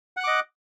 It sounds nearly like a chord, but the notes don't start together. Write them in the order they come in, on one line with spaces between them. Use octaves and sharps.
F#5 F#6 D6 D#5